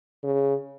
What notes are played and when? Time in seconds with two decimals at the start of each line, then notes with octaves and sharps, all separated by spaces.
0.24 C#3